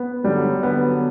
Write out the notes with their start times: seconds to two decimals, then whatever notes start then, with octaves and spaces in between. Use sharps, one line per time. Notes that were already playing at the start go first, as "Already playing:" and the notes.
Already playing: B3
0.24 D3 F#3 G3
0.63 D3 F#3 B3